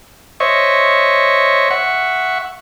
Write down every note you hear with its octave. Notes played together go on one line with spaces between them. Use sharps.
C5 C#5 D#5 E5 C#6
E5 F#5 C#6